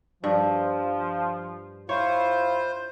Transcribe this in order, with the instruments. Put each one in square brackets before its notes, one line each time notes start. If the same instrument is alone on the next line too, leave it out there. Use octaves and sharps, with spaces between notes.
[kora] G2 [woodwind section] F3
[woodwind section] E4 F4 [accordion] C5 [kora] C#5